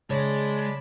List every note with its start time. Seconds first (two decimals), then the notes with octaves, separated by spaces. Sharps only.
0.10 C#3 G#3 C#5 D5 A5 B5